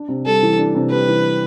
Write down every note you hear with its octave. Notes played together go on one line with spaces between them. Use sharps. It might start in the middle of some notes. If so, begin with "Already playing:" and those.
Already playing: D4
C3
G3 A4
E3
D4
C3
G3 B4
E3